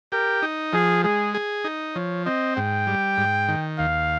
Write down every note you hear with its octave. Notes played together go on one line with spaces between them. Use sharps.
G4 A#4
D#4
F3 G#4
G#3 G#4
G#4
D#4
F3 C#5
C4 D#5
G#2 G5
G3
G#2
D#3
D#2 F5